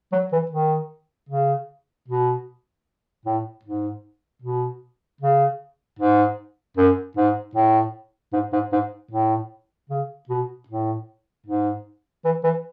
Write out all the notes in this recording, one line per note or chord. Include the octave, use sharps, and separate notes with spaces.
F#3
E3
D#3
C#3
B2
A2
G#2
B2
C#3
G#2
F#2
G#2
A2
G#2
G#2
G#2
A2
C#3
B2
A2
G#2
E3
E3